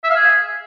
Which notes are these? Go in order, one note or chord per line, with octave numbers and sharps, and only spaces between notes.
E5
F5
G#4